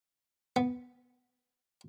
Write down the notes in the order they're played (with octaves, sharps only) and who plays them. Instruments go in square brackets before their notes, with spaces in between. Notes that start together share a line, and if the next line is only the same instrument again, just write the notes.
[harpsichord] B3